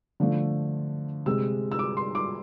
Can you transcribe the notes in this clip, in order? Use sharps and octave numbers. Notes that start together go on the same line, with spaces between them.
D3 F3 A3
C3 G#3 E6
E6
D6
C6
D6